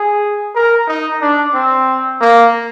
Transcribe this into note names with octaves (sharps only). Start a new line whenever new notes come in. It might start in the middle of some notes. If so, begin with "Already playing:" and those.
Already playing: G#4
A#4
D#4
D4
C4
A#3